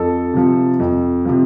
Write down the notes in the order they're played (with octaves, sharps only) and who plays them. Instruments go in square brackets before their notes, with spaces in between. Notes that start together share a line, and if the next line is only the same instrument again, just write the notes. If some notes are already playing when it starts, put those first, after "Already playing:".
Already playing: [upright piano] F2 A4
C3 F3
F2
C3 F3